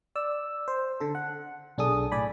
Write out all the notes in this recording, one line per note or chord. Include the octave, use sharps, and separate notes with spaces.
D5 E6
C5
D3 A4
F#5
B1 D4 G#4 A4 D#6
A2 D5 G#5 B5